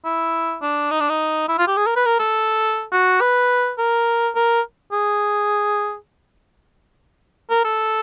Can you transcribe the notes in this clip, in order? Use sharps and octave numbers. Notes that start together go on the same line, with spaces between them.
E4
D4
D#4
D4
D#4
E4
F4
G4
G#4
A#4
B4
A#4
A4
F#4
B4
A#4
A#4
G#4
A#4
A4